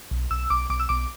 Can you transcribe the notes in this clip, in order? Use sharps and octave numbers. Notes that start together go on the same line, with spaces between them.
B1
B1 E6
B1 D6
B1 D6
E6
B1 D6